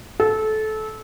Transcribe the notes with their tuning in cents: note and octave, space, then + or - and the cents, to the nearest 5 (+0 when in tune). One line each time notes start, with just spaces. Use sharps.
A4 -20